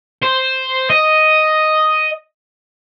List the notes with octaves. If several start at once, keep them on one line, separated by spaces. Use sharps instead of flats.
C5
D#5